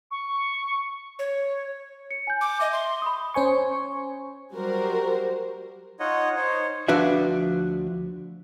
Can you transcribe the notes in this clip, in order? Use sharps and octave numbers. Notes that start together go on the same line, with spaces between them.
C#6
C#5
C#7
G#5 G6
D6
D#5 E5
C6
B5 D#6
C#4 C5 G#5 C#6
F#3 G3 F#4 A#4 C5
D#4 F4 C#5 D#5 F#5
D#4 C5 C#5
D2 F3 D4 F#4 B4 E5